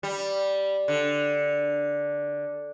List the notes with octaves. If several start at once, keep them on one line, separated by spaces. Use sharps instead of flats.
G3
D3